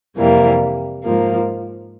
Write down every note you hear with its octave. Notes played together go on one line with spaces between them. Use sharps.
F2 C3 E3 G3 A#3
G#2 F3 A#3